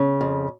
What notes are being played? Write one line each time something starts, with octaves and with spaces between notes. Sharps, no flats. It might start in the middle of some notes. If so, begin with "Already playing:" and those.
Already playing: C#3
F2